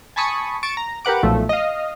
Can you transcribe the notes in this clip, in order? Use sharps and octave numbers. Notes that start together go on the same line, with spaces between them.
G#5 A5 B5 C#6 D#6
C#6 A6 D7 E7
A#5
G4 A#4 B4 F#5 D6
B1 A#2 F3 A3
D#5 F5